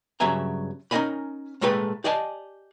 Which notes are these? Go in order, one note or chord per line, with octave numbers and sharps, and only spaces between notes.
G2 C#3 F#3 E5 G#5 A#5
C#4 D#4 A#4 D#5 G#5 B5
A#2 G#3 A3 A4 B4 G5
G4 D5 D#5 G#5 A5